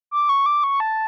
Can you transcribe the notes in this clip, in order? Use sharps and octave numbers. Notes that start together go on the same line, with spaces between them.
D6
C#6
D6
C#6
A5